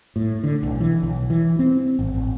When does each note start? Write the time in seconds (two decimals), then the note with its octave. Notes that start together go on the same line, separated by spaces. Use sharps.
0.16 A2
0.44 D3
0.63 B1
0.80 E3
1.03 B1
1.30 E3
1.59 C4
1.99 G#1
2.14 A1